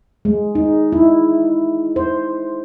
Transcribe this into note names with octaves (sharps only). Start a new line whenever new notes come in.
G#3
D#4
E4
C5